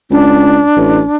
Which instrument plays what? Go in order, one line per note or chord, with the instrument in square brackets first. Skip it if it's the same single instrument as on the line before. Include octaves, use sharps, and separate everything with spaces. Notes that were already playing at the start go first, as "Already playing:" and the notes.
[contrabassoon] C#2 [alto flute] D4
[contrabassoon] A1